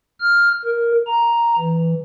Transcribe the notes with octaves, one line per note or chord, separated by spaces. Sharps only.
F6
A#4
A#5
E3